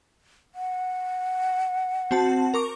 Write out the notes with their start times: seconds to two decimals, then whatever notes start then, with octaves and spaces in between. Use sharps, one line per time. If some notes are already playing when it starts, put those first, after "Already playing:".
0.55 F#5
2.11 C4 F#4 A5
2.54 A#4 C#6 D6